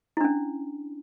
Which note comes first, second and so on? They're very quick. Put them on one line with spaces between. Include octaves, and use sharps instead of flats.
E4 D4 C#4